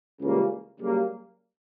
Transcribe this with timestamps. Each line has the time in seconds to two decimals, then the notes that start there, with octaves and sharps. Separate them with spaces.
0.21 C#2 C#3 E3 G3 A#3
0.79 F#2 C#3 G3 A#3